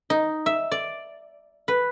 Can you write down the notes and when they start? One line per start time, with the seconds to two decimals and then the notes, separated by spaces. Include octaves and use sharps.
0.10 D#4
0.46 E5
0.72 D5
1.68 B4